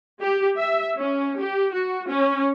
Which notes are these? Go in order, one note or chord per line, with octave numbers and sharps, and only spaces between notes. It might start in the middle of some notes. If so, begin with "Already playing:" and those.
G4
E5
C#4
G4
F#4
C#4